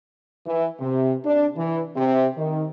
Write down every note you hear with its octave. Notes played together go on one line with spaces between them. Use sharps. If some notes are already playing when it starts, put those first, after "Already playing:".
E3
C3
D4
E3
C3
D#3